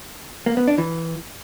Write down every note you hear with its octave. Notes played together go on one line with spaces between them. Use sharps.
A#3
B3
D4
E3